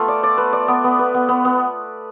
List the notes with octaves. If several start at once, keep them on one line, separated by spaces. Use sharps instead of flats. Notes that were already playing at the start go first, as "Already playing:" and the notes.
Already playing: A3 B3 F4
D5
D5
B4
D5
B3
B3
B4
B3
B3
B3